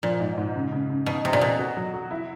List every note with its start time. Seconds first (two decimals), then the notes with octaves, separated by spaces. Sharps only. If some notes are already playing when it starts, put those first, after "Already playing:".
0.03 A#2 F3
0.20 G#2
0.38 G#2
0.55 C#3
0.72 C#3
0.90 C#3
1.06 B2 D#4
1.24 C3 D#4
1.33 A#2
1.41 B2 D#4
1.59 F#4
1.77 F#3
1.94 F#4
2.11 E4